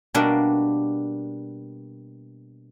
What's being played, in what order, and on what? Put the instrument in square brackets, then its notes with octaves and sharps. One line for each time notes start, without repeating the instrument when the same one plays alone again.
[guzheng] B2 G3 A#3 D4 D5